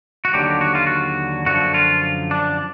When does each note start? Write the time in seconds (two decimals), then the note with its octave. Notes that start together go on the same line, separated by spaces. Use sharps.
0.25 F#4
0.33 D#2 D3 F#3 G4
0.61 F#4
0.75 F4
0.87 F#4
1.46 F#2 D3 F3 F#4
1.74 F4
2.31 D4